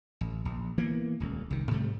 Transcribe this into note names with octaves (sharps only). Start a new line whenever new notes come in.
A1
A#1
E3 A#3 B3
D#1 C#2
C2 D#3
G#2 C3 G3 A3